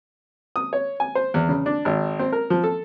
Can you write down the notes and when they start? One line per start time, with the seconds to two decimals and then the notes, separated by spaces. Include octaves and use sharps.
0.56 D#6
0.73 C#5
1.00 G#5
1.15 C5
1.34 E2
1.49 C#3
1.66 D4
1.85 G#1
2.19 C4
2.32 A#4
2.50 F3
2.64 A4